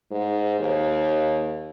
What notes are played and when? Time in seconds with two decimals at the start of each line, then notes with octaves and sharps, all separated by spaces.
0.11 G#2
0.59 D#2